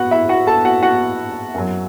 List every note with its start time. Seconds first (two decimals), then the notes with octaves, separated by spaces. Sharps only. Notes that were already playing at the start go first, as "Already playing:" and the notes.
Already playing: A2 B3 F#4 F#5
0.11 E4 E5
0.29 F#4 F#5
0.47 A4 A5
0.64 F#4 F#5
0.83 F#4 F#5
1.54 F#2 F#3